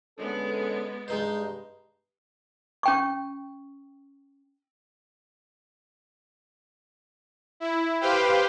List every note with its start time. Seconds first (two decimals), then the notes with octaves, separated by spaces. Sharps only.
0.18 D3 G#3 B3 C#4 A4
1.08 G2 G#3 D#4 C5
2.83 C#4 G5 C#6
7.60 E4
8.01 G4 B4 C5 F5 G5